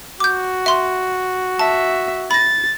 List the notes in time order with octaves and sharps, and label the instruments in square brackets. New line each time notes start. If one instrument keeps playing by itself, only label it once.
[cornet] F#4 [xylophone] D6 G6
[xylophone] E5 C6
[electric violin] E5 [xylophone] A5
[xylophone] B5 A#6 [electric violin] A6